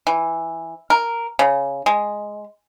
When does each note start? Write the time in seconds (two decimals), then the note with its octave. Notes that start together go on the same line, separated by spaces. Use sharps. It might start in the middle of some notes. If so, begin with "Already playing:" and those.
0.07 E3
0.90 A#4
1.39 C#3
1.86 G#3